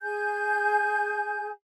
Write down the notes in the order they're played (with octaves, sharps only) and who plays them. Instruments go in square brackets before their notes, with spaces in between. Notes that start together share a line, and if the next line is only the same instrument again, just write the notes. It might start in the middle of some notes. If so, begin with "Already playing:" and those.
[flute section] G#4 G#5 G6